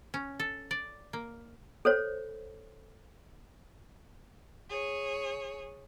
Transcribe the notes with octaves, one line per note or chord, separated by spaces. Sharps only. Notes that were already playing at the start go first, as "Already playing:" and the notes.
C#4
A4
D5
A#3
A4 C5 C#5
G#4 C#5